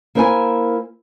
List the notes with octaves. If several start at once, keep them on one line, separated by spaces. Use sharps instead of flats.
A#3 E4 A#4 C5 G5 G#5